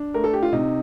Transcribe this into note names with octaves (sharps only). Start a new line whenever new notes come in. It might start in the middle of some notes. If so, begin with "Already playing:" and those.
Already playing: D4
A3 A#4
A4
G4
F4
C3 D#4